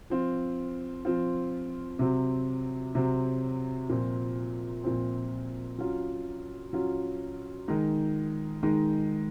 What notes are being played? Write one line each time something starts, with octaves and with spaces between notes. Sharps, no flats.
F3 C4 F4
F3 C4 F4
C3 F#3 C4
C3 F#3 C4
A#2 F3 C4
A#2 F3 C4
F#3 C#4 F4
F#3 C#4 F4
D#3 G#3 D#4
D#3 G#3 D#4